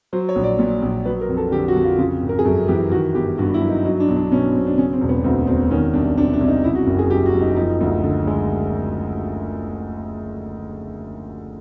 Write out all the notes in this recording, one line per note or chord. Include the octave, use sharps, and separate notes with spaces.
F#3 C5
C#5
A#1
D5
A#2
A#1
F#3 B4
A#4
F2
A4
D3 G4
F#4
F2
F4
C#3 F4
G#1
A#4
G#4
F#2 A4
E3 G4
D#3 F#4
G1 G4
G2 F#4
E4
F#3
D#4
F#3 D#4
D4
B1
D4
B2 C#4
B1 C4
D4
C#3 C#4
C4
E1
B3
D2 C4
E1 C4
D#3 C#4
C2 D4
C3 D4
D4
C2
D#4
C#3 E4
F#4
F#1
G#4
F#2 G4
F#4
F#1
D#4
F3 D#4
D2
D3
G#3